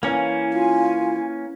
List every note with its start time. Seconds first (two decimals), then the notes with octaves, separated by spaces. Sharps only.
0.03 E3 A#3 C#4 F5 G#5
0.53 F4